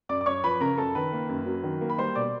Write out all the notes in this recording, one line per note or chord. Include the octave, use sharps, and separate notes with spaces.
F#2 D5 D6
D6
F#2 C#5 C#6
F3 B4 B5
C#3 A#4 A#5
F#2 A4 A5
D#3 B4 B5
A#3
F#2
F#3
D#3
A#3
B5
G3 C5 C6
B2 D5 D6